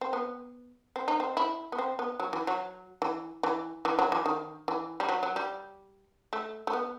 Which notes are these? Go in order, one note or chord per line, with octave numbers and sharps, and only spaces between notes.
C4
B3
C4
D#4
C4
E4
B3
C4
B3
F#3
E3
F#3
E3
E3
E3
F#3
E3
D#3
E3
G3
F#3
F#3
G3
A3
A3
B3